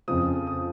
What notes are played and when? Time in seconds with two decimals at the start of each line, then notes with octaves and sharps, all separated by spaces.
0.08 F2 C#3 F3 D#6
0.47 D#6